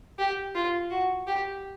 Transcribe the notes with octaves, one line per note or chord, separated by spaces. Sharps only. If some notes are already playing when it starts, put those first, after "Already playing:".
G4
F4
F#4
G4